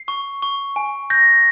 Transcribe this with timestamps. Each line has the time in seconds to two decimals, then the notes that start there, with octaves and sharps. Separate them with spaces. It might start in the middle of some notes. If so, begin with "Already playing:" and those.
Already playing: C7
0.08 C#6
0.43 C#6
0.76 G#5
1.10 G6 A#6